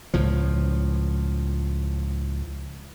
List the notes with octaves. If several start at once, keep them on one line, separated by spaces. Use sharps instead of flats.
C#2 A2 F3